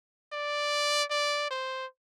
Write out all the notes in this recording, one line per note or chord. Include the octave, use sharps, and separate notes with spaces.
D5
D5
C5